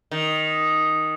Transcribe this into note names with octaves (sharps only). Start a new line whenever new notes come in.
D#3